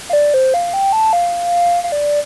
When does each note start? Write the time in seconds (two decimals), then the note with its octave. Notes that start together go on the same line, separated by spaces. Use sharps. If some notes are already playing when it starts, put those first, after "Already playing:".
0.09 F5
0.13 D5
0.34 C5
0.54 F5
0.73 G5
0.93 A5
1.13 F5
1.84 F5
1.92 D5